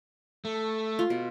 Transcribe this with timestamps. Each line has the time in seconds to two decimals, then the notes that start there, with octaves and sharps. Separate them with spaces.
0.45 A3
0.99 F4
1.10 B2